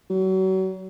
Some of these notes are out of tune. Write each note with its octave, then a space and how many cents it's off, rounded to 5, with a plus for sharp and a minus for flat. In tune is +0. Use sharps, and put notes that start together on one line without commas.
F#3 +35